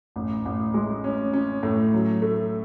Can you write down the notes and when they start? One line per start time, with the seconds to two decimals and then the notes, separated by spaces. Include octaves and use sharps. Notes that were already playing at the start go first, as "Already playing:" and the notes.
0.16 A1
0.45 A1
0.74 G#3
1.04 C#4
1.33 C#4
1.63 A2
1.94 F#3
2.22 A3